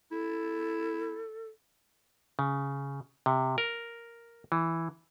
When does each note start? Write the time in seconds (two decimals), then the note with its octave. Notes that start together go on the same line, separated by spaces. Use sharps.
0.12 E4 A4
2.39 C#3
3.26 C3
3.58 A#4
4.52 E3